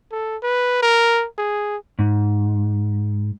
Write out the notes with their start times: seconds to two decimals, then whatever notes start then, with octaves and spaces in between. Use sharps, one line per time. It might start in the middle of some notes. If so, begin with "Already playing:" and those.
0.12 A4
0.42 B4
0.82 A#4
1.38 G#4
1.99 G#2